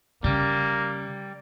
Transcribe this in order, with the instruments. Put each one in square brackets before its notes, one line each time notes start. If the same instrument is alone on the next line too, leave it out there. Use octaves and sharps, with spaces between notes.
[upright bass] C#3 [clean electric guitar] G3 [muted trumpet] A#3